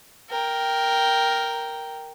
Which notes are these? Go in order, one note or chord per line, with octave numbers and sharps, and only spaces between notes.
A#4 G5